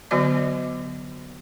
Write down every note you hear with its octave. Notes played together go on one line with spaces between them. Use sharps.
D3 F#3 B3 F#4 D5 D6